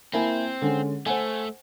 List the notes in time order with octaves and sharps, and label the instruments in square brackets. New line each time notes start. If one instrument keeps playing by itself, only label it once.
[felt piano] A#3 E4 G#5 [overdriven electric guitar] C4
[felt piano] D3 G#3 C#4
[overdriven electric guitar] A3 [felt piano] C5 F#5 G#5